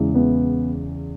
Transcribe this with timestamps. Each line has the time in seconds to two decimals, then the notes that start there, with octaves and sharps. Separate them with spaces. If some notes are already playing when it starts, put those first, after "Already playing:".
Already playing: E2 C#3 E3 G#3
0.15 B3